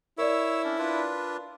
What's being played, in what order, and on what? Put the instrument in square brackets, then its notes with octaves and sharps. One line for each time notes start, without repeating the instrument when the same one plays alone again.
[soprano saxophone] E4 [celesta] A#4 D5 [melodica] C#5 E6
[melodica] C#4 D4
D4 F4 B4